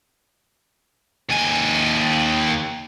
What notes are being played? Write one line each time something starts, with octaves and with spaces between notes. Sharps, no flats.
D#2 G#5